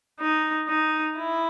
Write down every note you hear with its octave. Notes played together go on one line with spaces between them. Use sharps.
D#4
D#4
E4